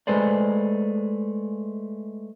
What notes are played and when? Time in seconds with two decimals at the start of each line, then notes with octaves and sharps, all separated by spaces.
0.07 G#3 A3 G#4 B4 C5 D5